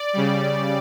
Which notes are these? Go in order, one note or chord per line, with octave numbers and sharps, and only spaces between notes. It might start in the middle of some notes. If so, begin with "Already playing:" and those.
Already playing: D5
C#3 G3